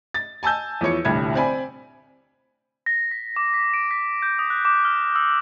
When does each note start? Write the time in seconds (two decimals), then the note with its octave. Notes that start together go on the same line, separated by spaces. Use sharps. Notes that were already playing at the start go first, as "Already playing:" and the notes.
0.14 A6
0.43 G#5 A5 E6 G6
0.81 E2 F3 C#5 C#7
1.05 D#1 C2 A2 D3 G3 G#6
1.35 C4 D5 G#5 B5
2.86 A#6
3.11 B6
3.36 D6
3.54 B6
3.74 D7
3.91 B6
4.22 G6
4.39 D#6
4.50 F#6
4.65 D6
4.85 F6
5.16 E6